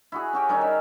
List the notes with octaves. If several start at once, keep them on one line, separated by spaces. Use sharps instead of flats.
E4 F#4 G#4
C#4 F#4 G4
D#3 G3 C#4 D#4
A#4 E5 G#5